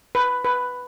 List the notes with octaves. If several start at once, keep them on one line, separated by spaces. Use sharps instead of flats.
B4
B4